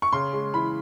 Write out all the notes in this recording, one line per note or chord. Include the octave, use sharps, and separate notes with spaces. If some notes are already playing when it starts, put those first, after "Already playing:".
C#6
C#3 C6
G#3
E3 B5